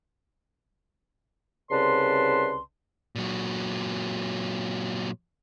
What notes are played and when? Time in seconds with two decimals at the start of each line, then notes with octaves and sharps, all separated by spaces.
1.71 C2 C#3 B4 D5 A5 C6
3.15 A#2 F#3